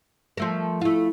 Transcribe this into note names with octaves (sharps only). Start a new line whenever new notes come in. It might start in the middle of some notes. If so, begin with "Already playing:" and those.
F3 A3 A#4
A3 E4 F4